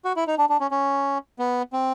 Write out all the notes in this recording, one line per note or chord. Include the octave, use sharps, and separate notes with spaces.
F#4
E4
D#4
D4
D4
C#4
C#4
B3
C4